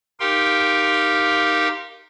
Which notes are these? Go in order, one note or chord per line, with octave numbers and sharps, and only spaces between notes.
D#4 G4 A#4 F5 G5 C6